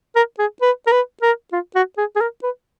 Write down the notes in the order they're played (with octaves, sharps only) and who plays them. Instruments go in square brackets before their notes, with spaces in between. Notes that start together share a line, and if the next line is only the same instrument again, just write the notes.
[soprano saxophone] A#4
G#4
B4
A#4
B4
A#4
F4
F#4
G#4
G#4
A#4
B4